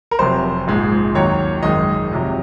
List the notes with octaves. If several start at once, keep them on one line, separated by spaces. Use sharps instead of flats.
A#4
F1 F2 C3 F#3 C5
A#1 G#2 F3 G#3
D#2 D#3 F#3 C#5
G#1 F#2 D#3 G#3 D#5
F2 C3 F#3